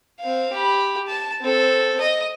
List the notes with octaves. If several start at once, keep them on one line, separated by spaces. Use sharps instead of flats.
C4 F5
G4 B5
A5
C4 A4
D#5